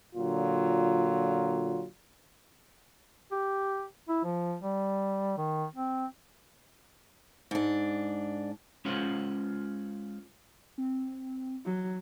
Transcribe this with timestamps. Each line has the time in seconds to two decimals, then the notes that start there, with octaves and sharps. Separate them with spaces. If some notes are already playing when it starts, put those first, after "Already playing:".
0.16 A#2 D3 F#3 F4
3.32 G4
4.08 E4
4.24 F3
4.62 G3
5.37 D#3
5.75 C4
7.51 G#2 D4
8.85 G#3 C#4 F4 C5 F#5
10.78 C4
11.66 F#3